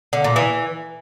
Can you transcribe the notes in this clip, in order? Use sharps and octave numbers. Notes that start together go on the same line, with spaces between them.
D3
A#2
E3